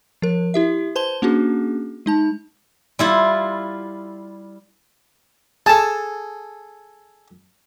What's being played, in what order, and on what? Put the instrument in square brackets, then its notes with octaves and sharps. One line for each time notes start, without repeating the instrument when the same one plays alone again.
[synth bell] F3 A#4
E4 G4 E5
B4 C5 A5 C6 G7
A#3 C#4 D4 F#4 G#4
G#3 D#4 A5
[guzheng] G3 E4 F4
[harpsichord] G#4 A4 [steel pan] A5